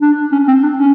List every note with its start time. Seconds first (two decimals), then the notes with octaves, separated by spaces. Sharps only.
0.01 D4
0.32 C#4
0.48 C4
0.63 D4
0.78 C#4